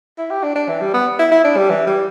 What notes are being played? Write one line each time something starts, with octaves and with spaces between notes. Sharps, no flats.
E4
G4
D4
D4
E3
G3
B3
E4
E4
D4
G3
E3
G3